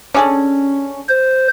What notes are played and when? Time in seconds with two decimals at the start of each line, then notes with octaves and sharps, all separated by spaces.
0.14 C#4 D4 G#4 A4
1.09 C5